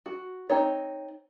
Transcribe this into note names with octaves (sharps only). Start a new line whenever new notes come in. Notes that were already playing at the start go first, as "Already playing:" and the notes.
F#4
C4 D#4 C#5